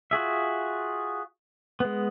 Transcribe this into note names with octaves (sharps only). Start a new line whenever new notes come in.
F4 F#4 G#4 E5
G#3 B3